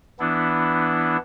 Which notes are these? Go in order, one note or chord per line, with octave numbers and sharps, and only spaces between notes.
E3 B3 D4 E4